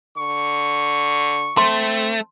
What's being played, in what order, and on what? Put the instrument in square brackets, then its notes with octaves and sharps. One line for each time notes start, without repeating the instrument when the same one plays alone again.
[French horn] D3 [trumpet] C#6
[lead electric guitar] A3 [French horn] C4 [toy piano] C6